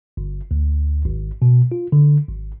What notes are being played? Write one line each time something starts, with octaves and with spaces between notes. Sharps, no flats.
G1
D2
G#1
B2
F4
D3
G#1